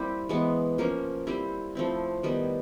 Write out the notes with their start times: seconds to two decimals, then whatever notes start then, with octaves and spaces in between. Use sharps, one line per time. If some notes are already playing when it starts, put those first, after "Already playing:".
Already playing: G3 A#3 C4 E4 G4
0.29 E3 G#3 B3
0.78 F3 A#3 C#4
1.27 G3 C4 E4 G4
1.75 F3 A3 C4 E4
2.23 D#3 G3 B3 E4